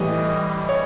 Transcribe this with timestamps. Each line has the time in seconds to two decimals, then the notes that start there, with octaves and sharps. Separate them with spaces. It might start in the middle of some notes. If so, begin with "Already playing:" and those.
Already playing: A2 E3 G3 D#5
0.69 C#5